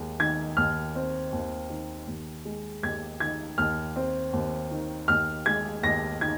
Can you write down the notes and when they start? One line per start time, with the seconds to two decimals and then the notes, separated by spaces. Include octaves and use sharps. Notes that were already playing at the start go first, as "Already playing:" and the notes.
Already playing: D#2 G#3
0.19 D#3 G#6
0.57 D#2 F6
0.95 C4
1.33 D#2
1.70 D#3
2.07 D#2
2.45 G#3
2.83 D#2 G#6
3.20 D#3 G#6
3.58 D#2 F6
3.96 C4
4.33 D#2
4.71 D#3
5.08 D#2 F6
5.46 G#3 G#6
5.83 D#2 A#6
6.21 D#3 G#6